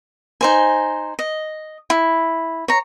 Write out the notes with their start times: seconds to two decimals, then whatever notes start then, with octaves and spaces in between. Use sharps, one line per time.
0.41 D#4 C5 G#5
1.19 D#5
1.90 E4
2.68 C#5 A#5